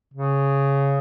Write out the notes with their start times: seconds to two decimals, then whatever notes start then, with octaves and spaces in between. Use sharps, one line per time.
0.14 C#3